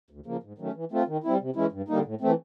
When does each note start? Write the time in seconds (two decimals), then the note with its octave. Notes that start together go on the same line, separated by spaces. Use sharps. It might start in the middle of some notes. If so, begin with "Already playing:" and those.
0.10 D2
0.26 C#3 F3 A#3
0.43 G#2
0.58 D#3 F#3 A3 C#4
0.75 E3
0.92 A3 C4 F4
1.07 D#3
1.24 G3 C4 E4
1.40 C3
1.56 E3 G#3 C#4 E4
1.72 G2
1.88 D3 G3 A#3 D#4
2.05 A2
2.21 E3 A3 C4